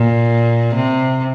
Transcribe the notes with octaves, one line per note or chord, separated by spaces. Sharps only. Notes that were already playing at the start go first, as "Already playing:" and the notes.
Already playing: A#2
C3